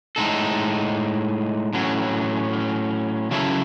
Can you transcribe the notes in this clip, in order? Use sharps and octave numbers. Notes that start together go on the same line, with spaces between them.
A2 G#3 D#4 A4
A2 F#3 C#4
C#3 F#3 C#4 E4 A4